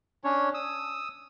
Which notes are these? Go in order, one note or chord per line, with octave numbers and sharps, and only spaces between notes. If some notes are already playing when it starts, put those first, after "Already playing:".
C#4 D4 C#5
D#6 E6